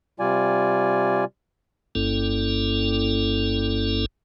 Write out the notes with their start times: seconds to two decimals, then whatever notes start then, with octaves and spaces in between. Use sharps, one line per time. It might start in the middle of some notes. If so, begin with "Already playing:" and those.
0.20 C3 G3 F4 D5 G#5
1.95 G1 G2 A#3 C#4 E4 A4